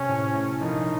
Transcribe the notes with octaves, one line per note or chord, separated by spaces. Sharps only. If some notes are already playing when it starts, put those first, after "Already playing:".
Already playing: C3 C#4
A2
A3
A#1 D#4